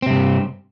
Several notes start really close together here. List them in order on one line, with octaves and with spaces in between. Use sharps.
C4 C3 G2